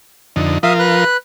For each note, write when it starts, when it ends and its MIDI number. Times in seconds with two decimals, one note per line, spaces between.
0.36 0.58 41
0.36 0.58 50
0.36 0.58 63
0.63 1.04 53
0.63 1.04 65
0.63 1.04 70
0.63 0.73 76
0.63 0.73 77
0.63 0.73 87
0.79 1.17 71
0.79 1.17 90